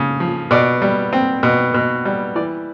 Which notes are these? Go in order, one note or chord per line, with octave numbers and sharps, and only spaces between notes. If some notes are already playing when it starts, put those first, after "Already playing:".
Already playing: C#3
F3
B2 D5
G3
C4
B2
B2
G3
E3 D5